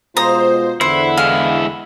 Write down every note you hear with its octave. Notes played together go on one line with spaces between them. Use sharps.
B2 G#3 F4 C5 A#5 D#6
E2 D3 E4 C5 F#5
G#3 E4 F5